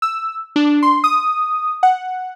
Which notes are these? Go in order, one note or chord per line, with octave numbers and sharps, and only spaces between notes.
E6
D4
C6
D#6
F#5